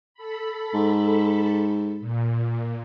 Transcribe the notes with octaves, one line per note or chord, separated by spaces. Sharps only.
A4 B5
G#2
A#2